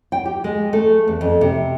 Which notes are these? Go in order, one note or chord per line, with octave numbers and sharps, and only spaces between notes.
G5
G4
G#3
A3
E2
F2
C3